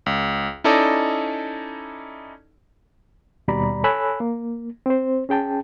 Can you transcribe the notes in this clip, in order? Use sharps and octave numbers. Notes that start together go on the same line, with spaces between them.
C#2
C#4 D#4 E4 A4 D5 D#5
D#2 B2 G3 D5 A#5 B5
A4 C#5 G#5 B5 E6 F#6
A#3
C4 C5
C#4 G#4 G5 A5